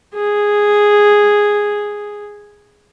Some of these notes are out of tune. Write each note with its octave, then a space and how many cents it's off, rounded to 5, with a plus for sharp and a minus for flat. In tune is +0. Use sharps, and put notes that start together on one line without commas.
G#4 -5